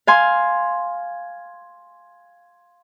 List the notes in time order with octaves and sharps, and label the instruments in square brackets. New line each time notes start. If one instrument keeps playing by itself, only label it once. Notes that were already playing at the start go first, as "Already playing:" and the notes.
[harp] F5 G#5 C6